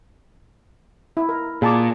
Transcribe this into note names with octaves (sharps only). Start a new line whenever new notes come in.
E4
A#4
A#2 G#4 A5 D6